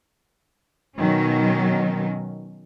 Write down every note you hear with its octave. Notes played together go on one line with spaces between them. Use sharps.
B2 D#3 F#3 C#4